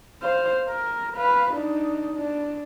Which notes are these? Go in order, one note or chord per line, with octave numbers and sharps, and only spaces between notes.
C5 F5
A#4
B4 F5
D4 D#4
D4